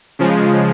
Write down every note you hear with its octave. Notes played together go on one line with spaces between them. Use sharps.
C#3 F3 G#3